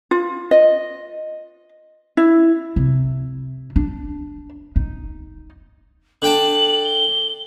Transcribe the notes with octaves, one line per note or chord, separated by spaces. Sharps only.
F4
D#5
E4
C3
D4
D#4
D3 G5 A5 F#7
G7